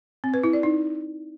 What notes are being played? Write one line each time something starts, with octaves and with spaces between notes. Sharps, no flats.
C4
B4
E4
D5
D#4